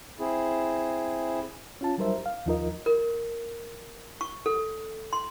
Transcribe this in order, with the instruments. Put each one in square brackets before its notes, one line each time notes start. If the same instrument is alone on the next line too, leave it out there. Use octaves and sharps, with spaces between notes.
[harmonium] C4 E4 G#4
[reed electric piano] C#4 F4 A5
F#3 G3 D#4 A#4 C5 E5
F5
D#2 F3 D#4 F4 A#4 D#5
[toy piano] A#4
C#6
A4
C6